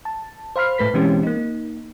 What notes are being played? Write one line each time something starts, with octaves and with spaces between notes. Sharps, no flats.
A5
C5 F5 B5 F6 C7
A2 A3 B4 B6
B2 E3 G#3 C4 C#4 G4
A#3 D#4